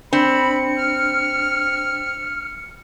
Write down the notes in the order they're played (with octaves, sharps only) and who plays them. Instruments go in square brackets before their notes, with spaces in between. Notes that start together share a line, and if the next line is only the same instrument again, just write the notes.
[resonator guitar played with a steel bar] C4 [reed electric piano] D4 [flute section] B5 [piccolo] C#7
[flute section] F6